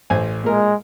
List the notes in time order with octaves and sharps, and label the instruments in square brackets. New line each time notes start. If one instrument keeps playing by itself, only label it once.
[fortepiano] A1 C5 G#5
[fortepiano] A#2 A#4 [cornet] G#3